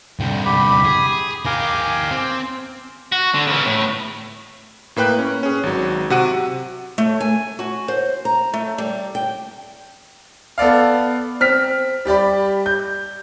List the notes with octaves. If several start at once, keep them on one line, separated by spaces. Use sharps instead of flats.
C2 D3 G5
G4 B5
G#4
G4 A#4 F5 G#5 D6
C4
F#4
D3
C#3 E3
A2
A2 A#3 B4 G5 F#6
C#4
C#4 G#4
G#1 F#3
C3 F#4 F#5 D#7
A3
G#5
F#4
C5
A#5
A3
G3
G5
B3 A4 D5 F5
C4 F6 B6
G3 G4 D5 B5
G6